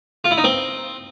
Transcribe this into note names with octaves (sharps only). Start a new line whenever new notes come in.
F4
E4
D#4
C4